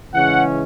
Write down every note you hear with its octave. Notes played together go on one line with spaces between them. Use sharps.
C#3 E3 G#3 C#4 F#5